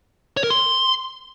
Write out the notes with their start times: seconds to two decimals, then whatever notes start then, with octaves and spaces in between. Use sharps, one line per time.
0.37 C#5
0.44 A#4
0.50 C6